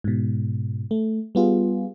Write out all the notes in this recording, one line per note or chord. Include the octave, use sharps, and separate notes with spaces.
G#2 B2
A3
G3 B3 F4 G#4